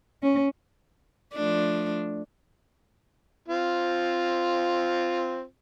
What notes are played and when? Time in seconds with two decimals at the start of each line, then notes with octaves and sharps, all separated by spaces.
0.23 C#4
1.33 F3 A3 D4
3.48 C4 F4